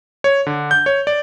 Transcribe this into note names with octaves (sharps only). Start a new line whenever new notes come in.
C#5
D3
G6
C#5
D5